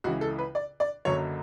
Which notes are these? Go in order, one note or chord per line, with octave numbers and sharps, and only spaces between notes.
C#2 C#3 E3 F#4
A4
B4
D5
D5
F#1 F#2 D3 F#3 C#5